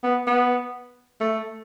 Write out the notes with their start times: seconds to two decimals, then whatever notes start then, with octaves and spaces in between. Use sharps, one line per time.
0.04 B3
0.27 B3
1.21 A3